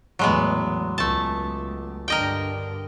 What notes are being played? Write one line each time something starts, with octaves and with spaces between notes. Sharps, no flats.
E2 A2 F#3 G#3 B3
C#2 A3 A5
G2 D3 A#4 D#5 G5